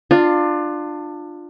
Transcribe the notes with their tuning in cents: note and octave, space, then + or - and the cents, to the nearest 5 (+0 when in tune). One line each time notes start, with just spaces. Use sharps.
D4 +25 F4 +5